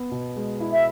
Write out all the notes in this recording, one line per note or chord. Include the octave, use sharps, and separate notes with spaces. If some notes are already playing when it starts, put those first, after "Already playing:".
Already playing: B3
B2
G#3
E4
E5